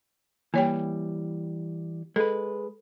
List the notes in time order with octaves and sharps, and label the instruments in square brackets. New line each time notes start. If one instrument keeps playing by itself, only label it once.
[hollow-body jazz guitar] E3 G3 [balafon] A#3 C#5 G5
[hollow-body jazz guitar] G#3 B4 [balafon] A4